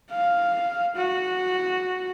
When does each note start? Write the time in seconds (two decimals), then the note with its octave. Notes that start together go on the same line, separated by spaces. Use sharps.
0.11 F5
0.96 F#4